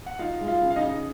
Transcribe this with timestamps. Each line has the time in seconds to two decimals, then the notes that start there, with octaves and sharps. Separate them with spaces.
0.06 F#5
0.19 D#4 F4 F5
0.41 G#3
0.48 F4 F5
0.61 C#3
0.70 F5
0.76 D#4 D#5
0.83 C#3